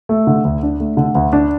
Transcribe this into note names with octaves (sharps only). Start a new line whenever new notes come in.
A3
D3
D2
D4
A3
D3
D2
D4